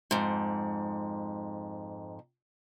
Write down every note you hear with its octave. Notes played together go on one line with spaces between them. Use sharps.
F2 G#2